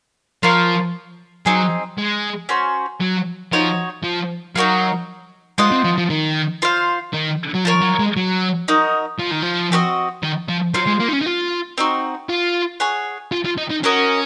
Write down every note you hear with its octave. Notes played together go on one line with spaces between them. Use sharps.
F3 F4 A#4 C#5 F5
F#3 C4 D#4 G#4
G#3
C#4 F#4 C5
F#3
F3 D#4 F#4 C#5
F3
F#3 D#4 F#4 A#4 F5
G#3 F4 C5 D#5 F#5
C4
F3
F3
D#3
F4 C5 F5
D#3
F#3
F3 F4 A#4 C#5
F#3
G#3
F#3
D#4 F#4 A#4 D#5
F3
D#3
F3
C4 F#4 A#4 D#5
D#3
F3
F#3 F4 C5 F5
G#3
A#3
D#4
C#4
D#4
F4
C4 D#4 F#4
F4
G#4 C#5 F#5
F4
F4
D#4
D#4
C#4 F#4 A#4 D#5